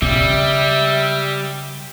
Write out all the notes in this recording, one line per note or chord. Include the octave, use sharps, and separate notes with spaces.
C#3 G3 E5